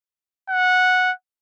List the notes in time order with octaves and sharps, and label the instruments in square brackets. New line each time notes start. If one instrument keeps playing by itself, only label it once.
[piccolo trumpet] F#5